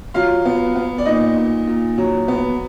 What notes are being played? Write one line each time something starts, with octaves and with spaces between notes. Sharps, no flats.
F#3 F4 F5
B3
B3
D5
A#2 D#4 D#5
A#2
A#2
F#3
B3